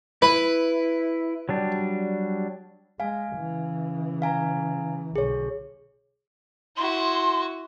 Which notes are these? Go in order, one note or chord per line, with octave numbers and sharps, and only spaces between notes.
E4 B4
F#3 G3 D4
G#3 F5 G#5
C#3 E3
F5 G#5 A#5
B1 D3 G#4 C#5
E4 F#4 C6